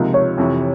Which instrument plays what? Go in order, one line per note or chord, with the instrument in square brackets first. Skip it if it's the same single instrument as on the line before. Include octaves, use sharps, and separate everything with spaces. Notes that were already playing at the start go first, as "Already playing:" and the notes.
Already playing: [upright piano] C#2 C3 F3 A#3 D#4
[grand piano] C#5
[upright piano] F2 C3 E3